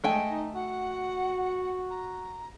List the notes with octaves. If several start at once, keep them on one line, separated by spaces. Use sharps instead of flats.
G#3 A3 D#5 G5 G#5
D#4
F#4 F#5
A#5